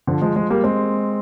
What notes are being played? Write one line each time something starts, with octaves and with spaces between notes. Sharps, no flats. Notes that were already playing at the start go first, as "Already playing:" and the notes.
D3 F3
F3 G#3
F3 G#3
G3 A#3
G#3 C4